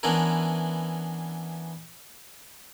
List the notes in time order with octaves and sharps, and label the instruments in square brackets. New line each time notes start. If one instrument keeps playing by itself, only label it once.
[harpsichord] E3 B3 C#4 D4 E4 A#4